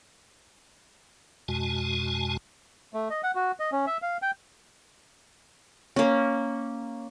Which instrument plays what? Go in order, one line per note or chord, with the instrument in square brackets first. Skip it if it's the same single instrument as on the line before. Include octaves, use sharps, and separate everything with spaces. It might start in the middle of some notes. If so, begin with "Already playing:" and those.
[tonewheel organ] F2 B2 G#3 F#4 G#5 A5
[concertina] A3
D#5
F#5
F#4
D#5
C#4
E5
F5
G5
[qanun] A#3 C#4